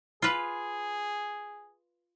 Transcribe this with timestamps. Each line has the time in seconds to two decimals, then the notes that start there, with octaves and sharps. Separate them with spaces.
0.22 F4 G#4 B4